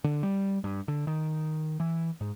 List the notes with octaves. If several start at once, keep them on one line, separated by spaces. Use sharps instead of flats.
D3
G3
G2
D3
D#3
E3
G#2